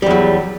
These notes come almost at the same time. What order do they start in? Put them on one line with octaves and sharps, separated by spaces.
G3 E2 F#3